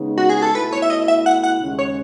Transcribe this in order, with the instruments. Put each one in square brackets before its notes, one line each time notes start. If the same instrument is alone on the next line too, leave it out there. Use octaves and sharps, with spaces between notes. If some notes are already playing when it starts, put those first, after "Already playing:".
Already playing: [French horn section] C#3 G#3 B3 D#4
[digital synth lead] F#4
G#4
A4
[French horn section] B2 A3 E4 [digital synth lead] B4
[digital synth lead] C#5
E5
D#5
E5
F#5
F#5
[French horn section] D#2 C#3 G#3 C#4
[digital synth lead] C#5